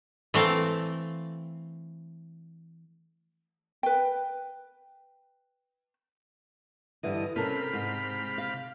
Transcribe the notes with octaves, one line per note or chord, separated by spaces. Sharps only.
E3 A3 C4 F5
B4 G5
G2 D3 E3 D#5
C3 C#4 A4 A#4 B5 F6
G#2
F5